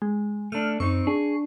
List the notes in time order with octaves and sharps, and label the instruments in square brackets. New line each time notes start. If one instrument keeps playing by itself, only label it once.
[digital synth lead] G#3
[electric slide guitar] A3 D4 [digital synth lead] F6
[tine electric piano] F#2 [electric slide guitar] C4 D#4 [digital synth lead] C#6
[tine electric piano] D4 [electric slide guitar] G#4